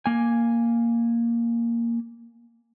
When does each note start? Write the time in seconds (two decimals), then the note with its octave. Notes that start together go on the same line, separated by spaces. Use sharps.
0.06 A#3 G#5